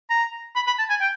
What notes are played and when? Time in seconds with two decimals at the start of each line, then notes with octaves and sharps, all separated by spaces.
0.10 A#5
0.56 B5
0.67 B5
0.79 A5
0.90 G#5
1.01 G5